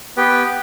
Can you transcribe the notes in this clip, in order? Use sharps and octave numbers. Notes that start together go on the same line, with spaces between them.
B3 G4 B4 G5